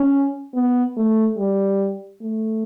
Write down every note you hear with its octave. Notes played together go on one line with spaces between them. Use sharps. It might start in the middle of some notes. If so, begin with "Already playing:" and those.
Already playing: C#4
B3
A3
G3
A3